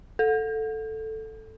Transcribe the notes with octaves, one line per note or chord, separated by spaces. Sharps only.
A4